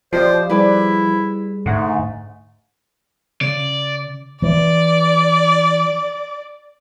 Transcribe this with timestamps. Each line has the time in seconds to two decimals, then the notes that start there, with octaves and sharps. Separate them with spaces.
0.13 F3 F4 G4 C5 D5 D#5
0.50 G3 E4 G#4 B4 D5
1.66 G#2 D3 A3 F#5
3.41 C#3 D5
4.42 E3 D5